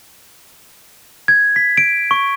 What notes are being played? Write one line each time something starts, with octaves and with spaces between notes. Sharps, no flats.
G#6
B6
D7
C#6